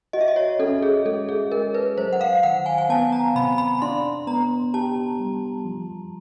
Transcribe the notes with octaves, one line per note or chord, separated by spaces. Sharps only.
F#4 D#5
E5
D#5
C#5
C#4 A4
G#4
G#3 A4
G#4
G#3 A#4
B4
F#3 C5
F#5
F5
D#3 F#5
G#5
G#5
B3 A5
A#5
C3 B5
B5
D4 C6
B3 A#5
G4 A5
G3
F3